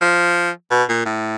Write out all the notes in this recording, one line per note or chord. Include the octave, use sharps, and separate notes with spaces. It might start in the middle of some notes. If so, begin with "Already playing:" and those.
F3
B2
A#2
A2